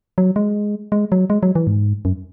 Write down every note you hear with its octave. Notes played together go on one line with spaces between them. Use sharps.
F#3
G#3
G#3
F#3
G#3
F#3
E3
G#2
F#2